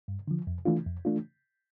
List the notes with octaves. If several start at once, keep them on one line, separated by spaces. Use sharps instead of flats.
G2
D3 F3
F2
E3 A3 D4 F4
F2
E3 A3 D4 F4